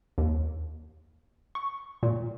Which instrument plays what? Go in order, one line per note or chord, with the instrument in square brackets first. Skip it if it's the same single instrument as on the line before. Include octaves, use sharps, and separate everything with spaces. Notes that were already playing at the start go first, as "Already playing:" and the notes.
[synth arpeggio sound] D#2
C#6
A#2